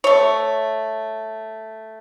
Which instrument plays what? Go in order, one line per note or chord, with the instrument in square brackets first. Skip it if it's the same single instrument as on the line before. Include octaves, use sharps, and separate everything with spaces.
[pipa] A3 C#5